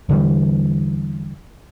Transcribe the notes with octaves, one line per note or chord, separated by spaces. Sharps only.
E2 D3 E3 G3